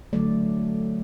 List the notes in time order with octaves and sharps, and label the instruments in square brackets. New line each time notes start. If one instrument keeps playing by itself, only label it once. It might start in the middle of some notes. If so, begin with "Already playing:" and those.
[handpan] D3 F#3 A3 D5